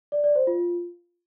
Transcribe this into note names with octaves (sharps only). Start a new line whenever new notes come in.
D5
D5
C5
F4